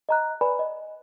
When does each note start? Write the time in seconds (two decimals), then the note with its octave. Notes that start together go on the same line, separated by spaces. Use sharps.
0.09 D#5 A#5 F#6
0.41 B4 D5 G#5 B5
0.59 D#5